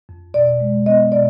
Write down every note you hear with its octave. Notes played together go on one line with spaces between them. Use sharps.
F2
B2 D5
G#3
B3 D#5
B2 D5